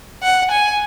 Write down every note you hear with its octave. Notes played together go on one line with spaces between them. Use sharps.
F#5
G#5